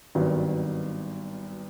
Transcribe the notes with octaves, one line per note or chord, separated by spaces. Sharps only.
G#1 G2 D#3 F#3 B3